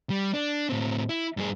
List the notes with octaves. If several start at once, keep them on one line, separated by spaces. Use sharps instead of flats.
G3
D4
A2 C4
E4
G2 G#4